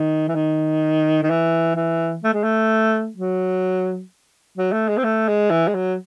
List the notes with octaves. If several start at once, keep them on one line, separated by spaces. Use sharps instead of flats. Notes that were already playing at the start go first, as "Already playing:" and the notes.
Already playing: D#3
E3
D#3
D#3
E3
E3
A3
G#3
A3
F#3
F#3
A3
G#3
C4
A3
G#3
E3
G#3
F#3